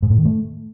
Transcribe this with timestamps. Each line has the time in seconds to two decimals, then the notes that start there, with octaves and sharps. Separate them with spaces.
0.02 G#2
0.10 A2
0.18 D#3
0.25 A3